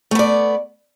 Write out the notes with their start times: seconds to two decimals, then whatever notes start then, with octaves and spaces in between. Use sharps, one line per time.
0.11 A3
0.15 B3
0.19 D5